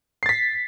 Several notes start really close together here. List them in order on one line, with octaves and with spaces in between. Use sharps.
C7 A6 B6